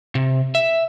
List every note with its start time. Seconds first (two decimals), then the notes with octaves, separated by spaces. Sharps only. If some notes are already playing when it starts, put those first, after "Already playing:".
0.15 C3
0.55 E5